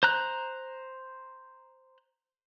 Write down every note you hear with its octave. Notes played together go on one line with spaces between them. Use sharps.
C5 A#5 F#6